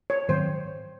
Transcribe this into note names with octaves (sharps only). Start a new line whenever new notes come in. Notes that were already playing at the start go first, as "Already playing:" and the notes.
C#5
G#2 D#3 F#3 C4 C5